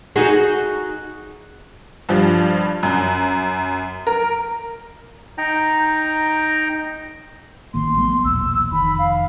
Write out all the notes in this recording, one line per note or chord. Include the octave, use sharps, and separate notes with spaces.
D#4 F#4 G#4
G2 F3 G3
F#2
A#4
D#4 G5 A#5
A1 D#3 A#3 C6
F#3 A3 B3
B1 E2 A#2 E6
F1 D#3 B5
F5